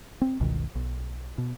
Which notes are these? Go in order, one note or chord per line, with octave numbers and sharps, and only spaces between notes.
C4
G1 C#2 B2 D#3
B1
B2